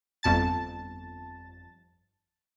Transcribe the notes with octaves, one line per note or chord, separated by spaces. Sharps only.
G1 F2 A5 A6